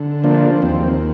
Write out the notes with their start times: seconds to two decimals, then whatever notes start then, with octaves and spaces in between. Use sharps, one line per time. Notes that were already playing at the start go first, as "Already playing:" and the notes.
Already playing: D3
0.24 F3 A#3 D4
0.62 D#2 C4